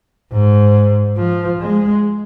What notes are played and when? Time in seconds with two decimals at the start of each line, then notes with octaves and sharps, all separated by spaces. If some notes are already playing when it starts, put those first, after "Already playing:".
0.32 G#2
1.17 F3
1.60 G#3